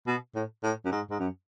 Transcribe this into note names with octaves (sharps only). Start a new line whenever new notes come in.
B2
A2
A2
F#2
G#2
G#2
F#2